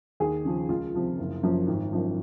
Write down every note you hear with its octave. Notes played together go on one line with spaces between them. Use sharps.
D#2 G#4
C#3 F3
C#2 F4
C3 F3
F#1
F#2 F3
G#1
F#2 F3